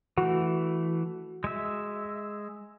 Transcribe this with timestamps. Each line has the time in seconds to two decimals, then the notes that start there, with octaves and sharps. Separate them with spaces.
0.18 E3 A3 F#4
1.44 G#3 E5